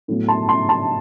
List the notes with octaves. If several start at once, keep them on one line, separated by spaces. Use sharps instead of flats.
A2 F#3 B3
A5 C6
A5 C6
A5 C6